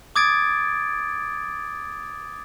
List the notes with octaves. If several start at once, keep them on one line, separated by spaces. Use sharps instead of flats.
D6 D#6 G#6 A6 D7